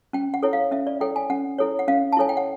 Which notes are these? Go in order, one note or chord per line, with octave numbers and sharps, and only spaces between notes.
C#4 G5
F#5
E4 A4 C#5
F5
C#4 E5
D5
E4 A4 C#5 G5
G#5
C#4 F#5
E4 A4 C#5
F#5
C#4 F5
A5
E4 A4 C#5 G#5
G5
F#5